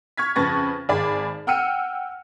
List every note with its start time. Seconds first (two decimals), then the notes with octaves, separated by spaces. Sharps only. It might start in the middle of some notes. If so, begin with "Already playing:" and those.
0.17 C#6 F6 G#6 B6
0.35 F2 C#3 B4 C#6 A6 A#6
0.89 G#1 G#4 D5 B5
1.47 F#5 G5 E6 F6 C#7 D#7